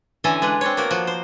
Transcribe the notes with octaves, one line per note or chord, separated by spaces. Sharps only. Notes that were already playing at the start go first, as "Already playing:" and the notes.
D3 E3 C#4 A4 G#5 A#5
G#3 D4 B4 F#5
C4 D4 C#5
A#3 B3 F#4 A#4
F3 F#4
C5